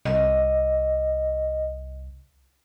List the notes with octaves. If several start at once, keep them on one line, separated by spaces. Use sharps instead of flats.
C2 D#5